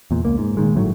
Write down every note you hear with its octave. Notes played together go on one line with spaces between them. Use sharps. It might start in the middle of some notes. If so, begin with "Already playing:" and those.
E2 A#2
C#2 A#3
G#2
A#2 D#3 G#3
G1 A2 F#3 A3